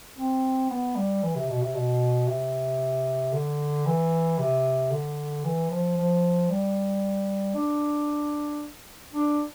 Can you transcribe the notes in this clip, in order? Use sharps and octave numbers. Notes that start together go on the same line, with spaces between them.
C4
B3
G3
E3
C3
B2
C3
B2
C3
D3
E3
C3
D3
E3
F3
F3
G3
D4
D4